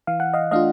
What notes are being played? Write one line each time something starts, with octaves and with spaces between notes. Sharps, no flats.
E3 F5
F#5
D#5 F5
A3 D4 F4 D#5 F5